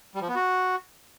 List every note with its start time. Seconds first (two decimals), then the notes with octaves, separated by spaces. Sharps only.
0.15 G3
0.22 F3
0.28 B3
0.35 F#4